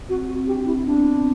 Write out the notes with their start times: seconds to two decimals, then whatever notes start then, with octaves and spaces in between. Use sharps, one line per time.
0.09 C4 F#4
0.28 C4 F#4
0.47 D4 G4
0.66 C4 E4
0.85 B3 D4
1.05 C4